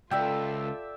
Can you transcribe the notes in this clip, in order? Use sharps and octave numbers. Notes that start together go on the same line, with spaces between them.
C#2 F4 A4 D5 E5 G5